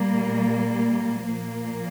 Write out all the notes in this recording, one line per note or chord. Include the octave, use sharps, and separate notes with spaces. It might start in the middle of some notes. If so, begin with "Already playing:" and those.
Already playing: A#2 G3 A#3
A#2 F3 A#3